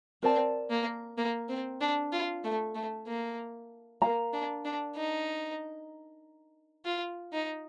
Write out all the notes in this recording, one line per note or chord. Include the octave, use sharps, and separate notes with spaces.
C4 A#4 D5 A5
A#3
A#3
C4
D4
F4
A3
A3
A#3
A#3 A#4 F5 A#5
D4
D4
D#4
F4
D#4